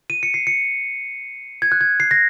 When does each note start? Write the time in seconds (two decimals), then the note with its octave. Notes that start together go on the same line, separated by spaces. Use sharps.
0.10 D#7
0.23 C#7
0.34 C7
0.47 C#7
1.62 G#6
1.72 F#6
1.81 G#6
2.00 C7
2.11 A#6